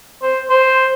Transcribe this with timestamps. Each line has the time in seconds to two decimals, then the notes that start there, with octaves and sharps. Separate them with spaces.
0.22 C5
0.50 C5